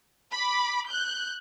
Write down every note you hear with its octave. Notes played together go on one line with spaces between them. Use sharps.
B5 D6
F#6 G6